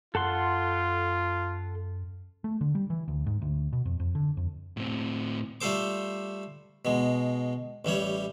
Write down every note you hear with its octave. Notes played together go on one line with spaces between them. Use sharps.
F#2 F4 A4 F#5 C6
A3
D3
G3
E3
D2
G#2
D2
B2
F2
F2
D3
F2
A2 C4
G3 A3 F4 A4 C5 D6
B2 G#3
A1 E3 G3 C#5